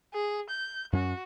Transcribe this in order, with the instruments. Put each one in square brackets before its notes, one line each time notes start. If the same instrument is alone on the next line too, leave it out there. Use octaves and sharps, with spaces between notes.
[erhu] G#4
G6
[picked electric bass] F#2 C#4 [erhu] F#4